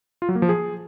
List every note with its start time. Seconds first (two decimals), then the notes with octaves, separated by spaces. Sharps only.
0.22 F4
0.29 F#3
0.35 A#3
0.42 F3
0.49 G#4